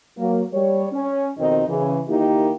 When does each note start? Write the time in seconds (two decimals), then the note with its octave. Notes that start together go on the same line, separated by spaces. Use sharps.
0.18 F#3 A#3
0.53 G3 C#5
0.93 C#4
1.39 F2 B2 D#3 C4 D#4
1.68 C#3 E3
2.09 D#3 A#3 D#4 E4 G4